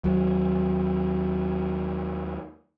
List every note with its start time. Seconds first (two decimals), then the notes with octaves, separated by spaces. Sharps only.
0.04 D#2 F#3